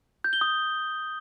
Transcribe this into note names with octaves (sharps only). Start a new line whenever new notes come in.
G6
G7
D#6